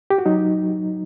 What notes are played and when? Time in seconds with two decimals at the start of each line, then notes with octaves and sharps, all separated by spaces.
0.10 G4
0.18 F#4
0.26 F#3 D#4